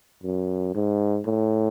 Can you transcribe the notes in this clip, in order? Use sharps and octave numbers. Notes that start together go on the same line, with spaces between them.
F#2
G#2
A2